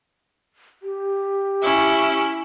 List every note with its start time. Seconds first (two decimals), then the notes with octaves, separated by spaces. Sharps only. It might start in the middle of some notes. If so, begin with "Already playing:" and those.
0.83 G4
1.62 C#4 E4